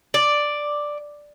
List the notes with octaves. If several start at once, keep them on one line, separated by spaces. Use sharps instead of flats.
D5